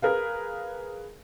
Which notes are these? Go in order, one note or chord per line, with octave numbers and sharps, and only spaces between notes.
G#4 A#4 B4 F5